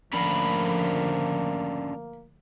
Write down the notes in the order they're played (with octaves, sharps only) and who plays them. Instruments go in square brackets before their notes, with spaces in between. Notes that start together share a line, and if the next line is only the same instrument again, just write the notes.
[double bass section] D3 F3 A3 [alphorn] A#3 [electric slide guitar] C#4 D4 A#4 [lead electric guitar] B5